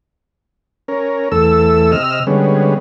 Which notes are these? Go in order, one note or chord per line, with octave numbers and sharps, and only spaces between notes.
C#4 A#4
E2 A3 A4 E6
C3 D#5 E6 F6
D3 G3 G#3 B3 C#4